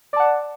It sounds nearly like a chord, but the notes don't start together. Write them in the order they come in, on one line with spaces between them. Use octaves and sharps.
D5 A5 F#5